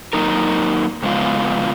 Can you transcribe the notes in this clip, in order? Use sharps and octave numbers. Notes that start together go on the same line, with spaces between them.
F#3 A#3 D#4 A#4
F2 C#3 G#3 B3 F4